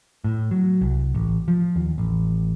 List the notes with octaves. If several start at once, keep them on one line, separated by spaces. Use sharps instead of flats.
A2
F#3
C2
A1
F3
D#2
A1